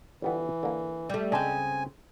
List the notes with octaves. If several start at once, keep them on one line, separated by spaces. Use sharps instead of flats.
G1 E3 G3 B3
D3 A#3
G3 A3
C#3 G#3 C4 D4 G#5